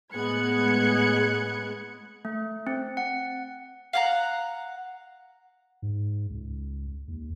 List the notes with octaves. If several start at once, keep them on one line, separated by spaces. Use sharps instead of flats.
A2 G#3 B3 F#6 G#6 C#7
A3
C4
F#5
F5 F#5 A#5
G#2
C#2
D#2